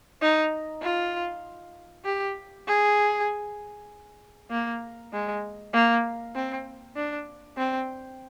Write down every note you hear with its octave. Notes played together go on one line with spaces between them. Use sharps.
D#4
F4
G4
G#4
A#3
G#3
A#3
C4
D4
C4